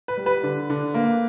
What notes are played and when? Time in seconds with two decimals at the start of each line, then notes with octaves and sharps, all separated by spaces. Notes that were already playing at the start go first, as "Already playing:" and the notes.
0.08 B4
0.17 G3
0.26 B4
0.43 D3
0.70 D3
0.94 A#3